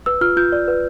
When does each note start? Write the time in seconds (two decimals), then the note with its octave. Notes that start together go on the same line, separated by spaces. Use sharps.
0.06 B4 E6
0.21 F4 F6
0.37 F4 G6
0.52 D5
0.68 B4